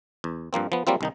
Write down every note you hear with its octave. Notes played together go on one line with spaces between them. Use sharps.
E2
G2 F3 A#3 C4
F3 B3
F#3 G3 A#3 C4 F4
C2 D#3 D#4